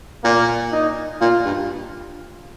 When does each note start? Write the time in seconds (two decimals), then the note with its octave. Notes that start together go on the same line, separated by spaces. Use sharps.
0.24 A#2 A#3
0.72 D#4
1.21 A#2 F4
1.45 G2